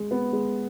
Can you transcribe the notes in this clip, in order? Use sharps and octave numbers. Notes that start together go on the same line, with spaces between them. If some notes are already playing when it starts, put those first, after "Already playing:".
Already playing: G#3
B3
G#3